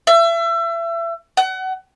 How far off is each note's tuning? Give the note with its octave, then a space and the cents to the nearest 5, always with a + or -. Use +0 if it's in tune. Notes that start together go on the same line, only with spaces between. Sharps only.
E5 +30
F#5 +30